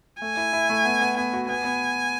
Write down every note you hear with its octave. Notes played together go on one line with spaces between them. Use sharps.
A3 G#5
E4
E4
A3
B3
B3
B3 G#5
F#4
B3 G#5
B3